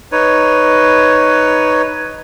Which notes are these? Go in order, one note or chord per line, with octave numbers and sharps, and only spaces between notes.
D#4 B4 C#5